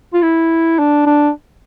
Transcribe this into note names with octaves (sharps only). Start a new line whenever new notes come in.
F4
E4
D4
D4